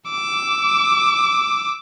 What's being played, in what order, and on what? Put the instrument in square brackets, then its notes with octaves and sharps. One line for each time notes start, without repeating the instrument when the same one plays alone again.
[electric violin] D6 E6